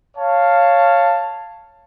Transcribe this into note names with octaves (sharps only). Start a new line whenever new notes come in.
C#5 F5 A5